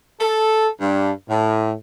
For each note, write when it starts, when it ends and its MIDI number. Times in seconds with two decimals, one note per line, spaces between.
0.21 0.68 69
0.81 1.11 43
1.29 1.73 45